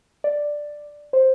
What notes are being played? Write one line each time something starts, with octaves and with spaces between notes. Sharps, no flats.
D5
C5